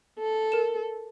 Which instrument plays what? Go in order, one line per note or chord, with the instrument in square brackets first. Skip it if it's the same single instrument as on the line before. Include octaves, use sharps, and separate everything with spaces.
[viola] A4
[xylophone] A#4 E7